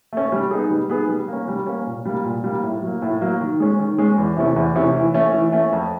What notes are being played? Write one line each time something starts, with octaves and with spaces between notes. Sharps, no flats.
A3 C#4
G3
B3 D#4 G#4
G3
B3 D#4 G#4
G3
A#3 C#4
G3
A#3 C#4
A#2
G3 A#3
A#2
G3 A#3
A2
F#3 A#3
A2
F#3 A#3
D#3
G#3 C#4
D#3
G#3 C#4
E2
C3 E3 A3 C#4
E2
C3 E3 A3 C#4
E3
A3 C#4
E3
A3 C#4
F2